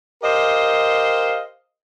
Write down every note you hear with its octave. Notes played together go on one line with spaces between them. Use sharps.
G4 A#4 C5 D#5 F5